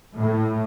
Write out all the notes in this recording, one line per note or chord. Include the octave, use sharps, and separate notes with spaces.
A2